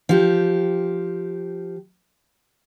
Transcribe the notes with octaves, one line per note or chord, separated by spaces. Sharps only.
F3 G4